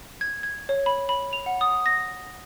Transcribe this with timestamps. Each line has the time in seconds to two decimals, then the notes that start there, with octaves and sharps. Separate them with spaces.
0.21 G#6
0.43 G#6
0.69 C#5
0.86 B5
1.09 B5
1.33 F7
1.46 F#5
1.61 D#6
1.86 A#6